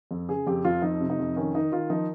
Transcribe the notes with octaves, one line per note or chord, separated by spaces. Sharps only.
F2
C#3 G#4
F2 G4
F2 F4
F3 D#4
C3
D#4
F2
D#3 C#4
D#3 D#4
D#3 F4
F3 D#4